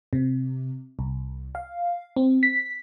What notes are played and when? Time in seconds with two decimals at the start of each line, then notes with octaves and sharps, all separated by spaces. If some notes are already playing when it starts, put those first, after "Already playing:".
0.13 C3
0.99 C2
1.55 F5
2.16 C4
2.43 B6